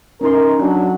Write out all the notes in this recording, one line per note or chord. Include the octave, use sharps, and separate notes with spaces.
C#4 D#4 A#4 C6
F#3 D4